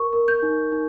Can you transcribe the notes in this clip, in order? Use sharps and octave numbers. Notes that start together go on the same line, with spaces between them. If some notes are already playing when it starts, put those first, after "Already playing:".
Already playing: A#4 C#6
A#4
G6
D#4
D#4